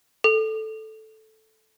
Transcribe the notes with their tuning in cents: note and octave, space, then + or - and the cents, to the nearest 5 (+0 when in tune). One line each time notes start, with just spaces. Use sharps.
A4 -5